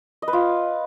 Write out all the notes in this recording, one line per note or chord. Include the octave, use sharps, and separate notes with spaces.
D#5
B4
F4